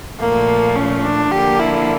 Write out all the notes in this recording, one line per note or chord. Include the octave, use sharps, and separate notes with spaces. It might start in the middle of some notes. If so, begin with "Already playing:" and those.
A#2 F3 A3 A#3
C#4
D4
D3 F3 A#3 G4
E4